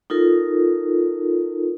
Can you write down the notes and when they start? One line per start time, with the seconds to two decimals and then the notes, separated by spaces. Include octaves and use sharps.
0.10 D#4 F4 A4 A#4